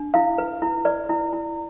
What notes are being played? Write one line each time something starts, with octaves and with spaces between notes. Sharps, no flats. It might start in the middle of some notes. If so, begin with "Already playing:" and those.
Already playing: D4
E4 F5
B4
E4
B4 D5
E4
E4